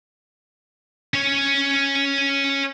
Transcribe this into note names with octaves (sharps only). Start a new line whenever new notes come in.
C#4 C#5